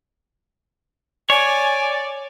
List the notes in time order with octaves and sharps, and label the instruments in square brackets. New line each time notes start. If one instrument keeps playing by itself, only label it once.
[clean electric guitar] C#5 [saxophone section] D5 [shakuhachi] G#5